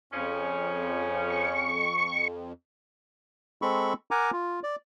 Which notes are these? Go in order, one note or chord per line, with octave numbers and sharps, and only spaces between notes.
F2 C#3 F3 C#4
C#6
G#3 C4 A4 B5 C#6
A#4 F#5 G#5 A#5 D6
F4
D5